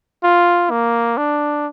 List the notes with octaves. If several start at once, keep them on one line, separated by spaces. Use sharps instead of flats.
F4
A#3
D4